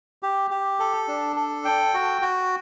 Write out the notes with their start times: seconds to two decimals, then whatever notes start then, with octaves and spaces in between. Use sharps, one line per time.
0.23 G4
0.51 G4
0.80 A4
1.08 D4
1.36 A4
1.65 G5
1.94 F#4
2.22 F#4